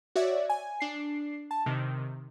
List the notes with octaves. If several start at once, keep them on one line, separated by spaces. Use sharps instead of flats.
F#4 C#5 D5 E5
G#5
D4 C7
A5
C3 D#3